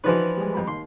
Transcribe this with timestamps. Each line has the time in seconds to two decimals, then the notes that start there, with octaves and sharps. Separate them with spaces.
0.04 E3 F3 D4 D#4 F#4 B4
0.37 G3 G#3
0.53 F2 G3 B5
0.67 D#2 C6